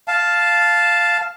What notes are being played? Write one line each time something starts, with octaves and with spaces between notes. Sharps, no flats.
F5 A5